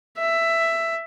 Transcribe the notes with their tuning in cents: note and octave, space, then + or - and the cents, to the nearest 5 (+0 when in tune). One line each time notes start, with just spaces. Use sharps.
E5 +10